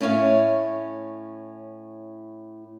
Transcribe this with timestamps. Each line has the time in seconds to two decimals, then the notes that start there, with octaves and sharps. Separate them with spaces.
0.01 A2 C#4 E4 C#5 F5